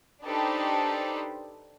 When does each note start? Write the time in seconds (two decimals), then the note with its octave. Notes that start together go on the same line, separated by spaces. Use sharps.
0.24 D4 D#4 G4 A4 B4 C5